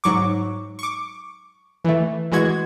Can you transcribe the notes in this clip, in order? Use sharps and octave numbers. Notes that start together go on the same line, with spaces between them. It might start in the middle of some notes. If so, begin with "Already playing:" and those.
G#2 F#3 C#6 D6
C#6 D6
E3 A3
E3 G#3 F#4 G#6